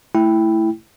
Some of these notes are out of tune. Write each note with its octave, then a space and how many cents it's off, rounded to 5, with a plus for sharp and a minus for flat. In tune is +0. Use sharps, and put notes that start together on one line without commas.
A3 +0 E4 +0 G5 +0